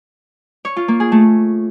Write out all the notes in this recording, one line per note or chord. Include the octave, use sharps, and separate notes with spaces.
C#5
F4
A#3
G#4
A3